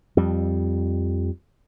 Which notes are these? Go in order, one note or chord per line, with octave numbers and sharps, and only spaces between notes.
F2 G3